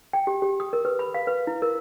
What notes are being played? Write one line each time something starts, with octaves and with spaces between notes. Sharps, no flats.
G5
G4
G4
D#6
A#4
B4
B5
F5
B4
E4
A#4